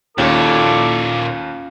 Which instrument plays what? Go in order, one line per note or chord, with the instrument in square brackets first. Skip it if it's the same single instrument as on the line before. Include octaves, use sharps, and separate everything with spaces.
[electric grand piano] D#2 [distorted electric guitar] A#2 C#5 [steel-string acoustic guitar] C#4 F4 [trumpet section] E4 A4 D6